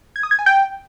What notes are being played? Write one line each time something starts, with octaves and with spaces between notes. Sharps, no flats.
G#6
D#6
G#6
G#5
G5